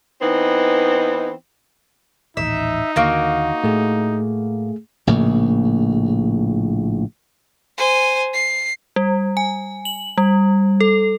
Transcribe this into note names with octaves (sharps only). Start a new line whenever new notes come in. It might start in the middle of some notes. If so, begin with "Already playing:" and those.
E3 B3 C4 D#4
D#1 A1 D#4 E5
D#2 D3 A#3 F#4
A2 A3 G#4
A#1 A2 C#3 A#3
C5 G#5
C7
G3
G#5
F#7
G3
A4